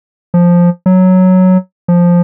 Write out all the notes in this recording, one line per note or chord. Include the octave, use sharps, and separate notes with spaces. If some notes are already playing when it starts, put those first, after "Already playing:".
F3
F#3
F3